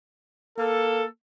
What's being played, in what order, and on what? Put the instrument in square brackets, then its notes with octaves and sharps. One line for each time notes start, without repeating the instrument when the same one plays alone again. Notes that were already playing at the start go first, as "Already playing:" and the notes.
[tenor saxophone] A#3 [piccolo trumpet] A4